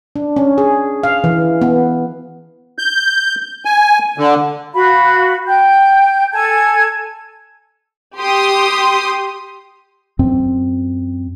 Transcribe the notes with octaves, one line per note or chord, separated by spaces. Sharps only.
D4
C#4
G#4
F5
E3
B3
G6
G#5
D3
F#4 F5 B5
G5 G6
A4 G#5 A5 G#6
G4 C6 D#6
F#2 C4